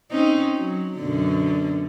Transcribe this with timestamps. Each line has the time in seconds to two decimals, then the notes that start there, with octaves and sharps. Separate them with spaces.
0.11 C4 C#4 D#4
0.57 F#3
0.99 F#2 B2 D3